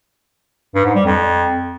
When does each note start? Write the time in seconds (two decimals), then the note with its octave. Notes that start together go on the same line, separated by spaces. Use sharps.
0.75 G2
0.85 G#2
0.95 G3
1.06 F2